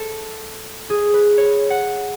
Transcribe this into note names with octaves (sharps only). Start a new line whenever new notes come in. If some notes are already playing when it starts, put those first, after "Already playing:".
Already playing: A4
G#4
B4
C#5
F#5